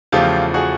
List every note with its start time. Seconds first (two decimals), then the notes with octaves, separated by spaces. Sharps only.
0.12 E2 C#3 F3 A3 F4 G4
0.54 F#4 G#4